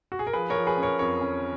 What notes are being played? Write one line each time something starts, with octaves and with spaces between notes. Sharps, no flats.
F#4
G#4
A#4
F3 G#4 B4
A#4 C#5
F3
G#4 B4
C#4
A#4 C#5
F2 A#4 C#5
C#4